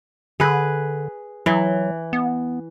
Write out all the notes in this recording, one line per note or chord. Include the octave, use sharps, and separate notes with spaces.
D3 G#4 B4
E3 F#3
B3